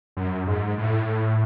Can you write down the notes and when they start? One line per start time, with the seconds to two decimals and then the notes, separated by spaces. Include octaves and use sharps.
0.17 F#2
0.47 G#2
0.78 A2